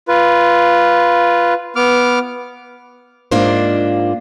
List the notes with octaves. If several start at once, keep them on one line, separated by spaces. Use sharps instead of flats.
F4 B4
B3 D6 F6
G#2 A#3 D4 F4 C5